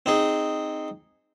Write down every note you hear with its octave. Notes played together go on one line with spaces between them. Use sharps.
C4 D#4 G#4